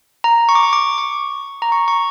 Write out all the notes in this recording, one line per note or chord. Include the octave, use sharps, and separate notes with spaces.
A#5
C#6
D6
C#6
D6
C#6
A#5
C#6
C#6